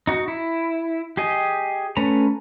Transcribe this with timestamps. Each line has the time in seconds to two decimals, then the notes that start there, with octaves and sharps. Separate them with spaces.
0.07 D#4 F#4
0.28 E4
1.17 G4 G#4 D#5
1.97 A3 C#4 B4 A#5